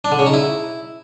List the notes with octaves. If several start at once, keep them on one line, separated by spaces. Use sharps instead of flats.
D4
D3
C#3
D#4
E4